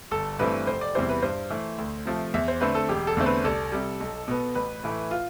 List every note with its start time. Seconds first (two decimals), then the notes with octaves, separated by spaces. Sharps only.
0.11 G1 A4
0.39 G2 E3 A3 C4 B4
0.67 F1 C5
0.81 D5
0.95 E2 C3 E3 G3 C5
1.09 B4
1.22 G2 C5
1.50 E3 A3
1.78 D2
2.06 C3 F3 A3
2.34 E2 E5
2.48 C5
2.61 D3 A3 C4 B4
2.75 A4
2.89 E1 G4
3.07 A4
3.17 E2 D3 A3 C4
3.26 B4
3.44 C2 A4
3.72 C3 G3
4.00 B1
4.28 B2 B3
4.55 A1 B4
4.83 A2 E3 A3
5.11 F4